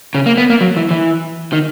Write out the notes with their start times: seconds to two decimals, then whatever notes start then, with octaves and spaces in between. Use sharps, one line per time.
0.15 C#3
0.26 A#3
0.38 B3
0.50 A#3
0.61 F#3
0.77 E3
0.91 E3
1.53 D#3